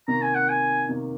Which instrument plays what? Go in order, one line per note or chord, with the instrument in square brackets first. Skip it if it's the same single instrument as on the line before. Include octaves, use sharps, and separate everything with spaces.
[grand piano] C3 D#3 A#3 [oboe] A#5
[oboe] G#5
F#5
G#5
[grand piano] C3 D#3 A#3